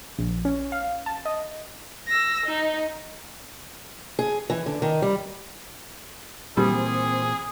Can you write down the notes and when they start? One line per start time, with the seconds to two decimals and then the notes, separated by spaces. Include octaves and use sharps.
0.19 A#1
0.45 C#4
0.72 F5
1.06 A5
1.25 D#5
2.07 E6 A#6
2.46 D#4
4.19 G#4
4.50 E3
4.66 D3
4.82 D#3
5.02 G3
6.57 A#2 E3 G3 A#3 C4 G#4